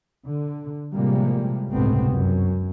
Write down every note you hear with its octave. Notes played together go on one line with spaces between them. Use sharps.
D3
A2 C3 F3 G3 G#3 A#3
G1 C#2 A2 C3 B3 C4
F#2